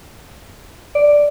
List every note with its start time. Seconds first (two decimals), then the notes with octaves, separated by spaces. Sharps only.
0.95 D5